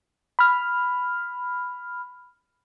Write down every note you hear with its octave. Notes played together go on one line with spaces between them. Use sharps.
B5 F6